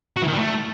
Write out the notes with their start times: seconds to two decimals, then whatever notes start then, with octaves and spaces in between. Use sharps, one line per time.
0.17 F#4
0.22 E3
0.28 D#3
0.33 G3
0.39 A3